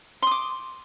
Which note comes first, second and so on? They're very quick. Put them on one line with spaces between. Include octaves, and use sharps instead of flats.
C6 D#6 D6